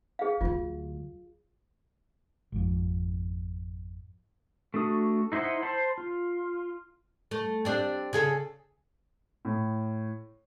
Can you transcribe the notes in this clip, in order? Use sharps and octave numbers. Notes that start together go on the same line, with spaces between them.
G#4 F5
D2 F#3 F4
G#1 F2
A3 D4 F#4 D#6
D#4 E4 C5 D#5 F#5
C5 A5 B5
F4
A3
C4 D4 G4
C#3 G#4 A4
A2